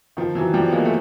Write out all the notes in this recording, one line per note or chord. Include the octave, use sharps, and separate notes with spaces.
D#3 F3
E3 F#3
F3 G3
B3
G#3 A#3
A3